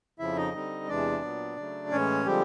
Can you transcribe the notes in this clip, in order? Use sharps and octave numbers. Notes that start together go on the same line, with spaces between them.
F2 C#3 F3 E4 E5
D#4 D#5
D3 G3 C4 D#4
E2 C3 E3 G#3 D4 D5
A#2 F#3 B3
C#3 F#3 A3
A2 E3 G#3 C#4 C#5
D3 F3 G3 G#3 C4 G4